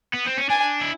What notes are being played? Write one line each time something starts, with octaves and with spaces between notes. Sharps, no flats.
B3
C4
C#4
D4 G#5
E4